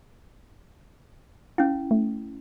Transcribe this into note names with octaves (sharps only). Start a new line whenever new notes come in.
C#4 E4 F5
A3